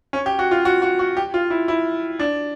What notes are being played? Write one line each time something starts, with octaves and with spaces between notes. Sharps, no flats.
C#4
G4
F#4
F4
F#4
F#4
F#4
G4
F4
E4
E4
D4